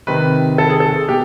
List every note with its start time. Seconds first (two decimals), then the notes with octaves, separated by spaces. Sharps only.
0.07 C3 D#3 B4
0.58 A4
0.70 G#4
0.80 A4
1.08 B2 G4